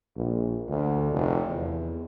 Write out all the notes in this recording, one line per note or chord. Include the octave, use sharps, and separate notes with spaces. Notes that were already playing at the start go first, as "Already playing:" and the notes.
A#1
D2
F1
E2